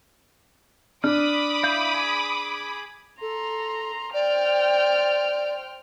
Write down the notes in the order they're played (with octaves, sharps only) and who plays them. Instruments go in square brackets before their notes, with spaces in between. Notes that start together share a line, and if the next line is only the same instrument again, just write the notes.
[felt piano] D4 [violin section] B5 D6 D#6 [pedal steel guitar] F6
[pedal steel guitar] E4 F5 G6
G#4
[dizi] A4 [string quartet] A#5 C6
[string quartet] C5 G5 F6 [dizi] D5